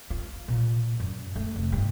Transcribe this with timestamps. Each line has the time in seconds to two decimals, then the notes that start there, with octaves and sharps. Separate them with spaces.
0.10 F4
0.48 A#2
1.00 F#2
1.36 A3
1.56 F1
1.72 G2